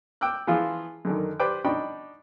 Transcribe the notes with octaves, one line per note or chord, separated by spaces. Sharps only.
G5 D6 E6 F#6
E3 F3 F4 G#4
F#2 D3 D#3
G4 B4 C5 D5 G5 D6
D4 D#4 D5 G5 B5 C#6